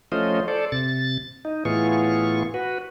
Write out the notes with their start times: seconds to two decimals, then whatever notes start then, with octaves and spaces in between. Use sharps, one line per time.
0.12 F3 A3 C#4 F4 C5 D#5
0.48 A4 C5 D5
0.72 C3 A6
1.45 D#4
1.65 A2 E3 B3 F4 G#4 C#6
2.54 F#4 B4